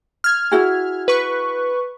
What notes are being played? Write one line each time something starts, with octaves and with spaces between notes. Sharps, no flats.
F6 G#6
E4 F#4 G#4
B4 C#6